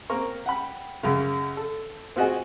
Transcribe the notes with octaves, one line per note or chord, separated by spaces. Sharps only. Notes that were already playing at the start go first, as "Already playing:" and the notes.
A#3 C4 A#4 C#6
F#5 G5 B5
F#2 C#3
A4
C4 F4 F#4 G#4 D#5 G#5